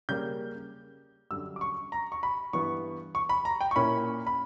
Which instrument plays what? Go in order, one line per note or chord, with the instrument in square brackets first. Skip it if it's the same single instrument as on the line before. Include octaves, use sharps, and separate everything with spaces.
[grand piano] C#3 G3 A#3 G6
F#2 D3 G3 E6
D6
C#6
A#5
C#6
B5
G2 E3 B3 C#6
C#6
B5
A#5
G5
C#6
A#2 A#3 C#4 E4 B5
B5